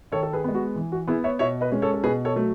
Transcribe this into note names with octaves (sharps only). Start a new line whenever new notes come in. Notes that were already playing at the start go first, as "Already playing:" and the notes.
D#3 A4 C#5
A4
G#4 B4
G#3 B3
F#4
E3
F#4
B3 E4 G#4
C#5 E5
B2 C#5 E5
B4 D#5
G#3 C#4
A4 C#5
A4
B2 G#4 B4
A4 C#5
F#3 A3